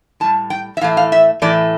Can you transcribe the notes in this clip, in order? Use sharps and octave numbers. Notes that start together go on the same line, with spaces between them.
A2 G3 A5
G5
E5
A2 E3 A3 F5
F5
E5
A2 E3 A3 D5